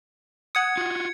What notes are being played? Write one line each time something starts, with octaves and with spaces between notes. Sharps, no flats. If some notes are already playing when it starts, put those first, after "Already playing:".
F#5 D#6 G#6 C#7
F4 F#4